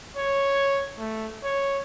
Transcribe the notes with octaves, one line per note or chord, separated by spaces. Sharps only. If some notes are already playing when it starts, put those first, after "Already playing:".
C#5
A3
C#5